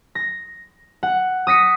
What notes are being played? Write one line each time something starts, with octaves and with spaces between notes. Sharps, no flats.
A#6
F#5
D#6 A#6 B6 C#7